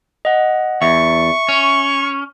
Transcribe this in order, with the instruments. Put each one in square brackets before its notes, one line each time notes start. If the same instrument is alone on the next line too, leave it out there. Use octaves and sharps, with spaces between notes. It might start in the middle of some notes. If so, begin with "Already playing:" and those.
[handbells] D#5 F#5
[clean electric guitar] E2 [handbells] E5 [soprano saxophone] C#6
[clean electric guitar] C#4